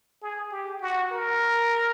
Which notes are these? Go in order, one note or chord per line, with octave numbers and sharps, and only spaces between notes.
G#4
G4
F#4
A#4